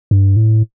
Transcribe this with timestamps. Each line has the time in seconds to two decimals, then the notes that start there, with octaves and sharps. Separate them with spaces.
0.11 G2
0.36 A2